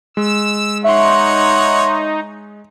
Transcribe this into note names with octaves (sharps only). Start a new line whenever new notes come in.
G#3 E6
D#4 C#5 E5 F#5 C6